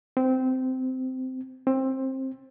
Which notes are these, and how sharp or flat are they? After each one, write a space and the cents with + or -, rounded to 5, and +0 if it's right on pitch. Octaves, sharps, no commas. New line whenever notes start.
C4 -15
C4 +20